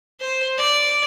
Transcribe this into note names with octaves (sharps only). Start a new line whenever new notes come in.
C5
D5